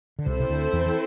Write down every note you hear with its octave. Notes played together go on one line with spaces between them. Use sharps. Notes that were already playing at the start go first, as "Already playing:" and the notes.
D3
C2 C3 C4 E4 A4 C5
C3
D2 D3
E2 E3
E3